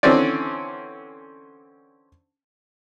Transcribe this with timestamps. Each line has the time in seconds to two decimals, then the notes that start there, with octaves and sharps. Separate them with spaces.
0.03 D3 E3 C4 C#4 D5